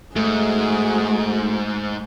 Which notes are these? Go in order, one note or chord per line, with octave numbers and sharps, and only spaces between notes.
G#2 A3 F#4 G#4